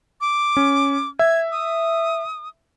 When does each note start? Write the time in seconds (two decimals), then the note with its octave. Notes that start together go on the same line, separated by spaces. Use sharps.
0.21 D6
0.57 C#4
1.19 E5 G#6
1.52 D#6